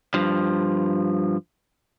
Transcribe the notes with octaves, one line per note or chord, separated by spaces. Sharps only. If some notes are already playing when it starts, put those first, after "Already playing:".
G2 F3